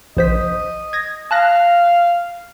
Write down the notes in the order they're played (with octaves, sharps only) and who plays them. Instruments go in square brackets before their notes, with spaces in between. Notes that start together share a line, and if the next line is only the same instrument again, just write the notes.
[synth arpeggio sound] A#1 C5 B6 [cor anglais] D#5
[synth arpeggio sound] G#6 A#6
[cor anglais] F5 [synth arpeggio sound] A5 F#6 A#6